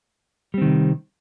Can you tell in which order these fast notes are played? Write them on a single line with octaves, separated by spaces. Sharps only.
G3 C4 D#3 C3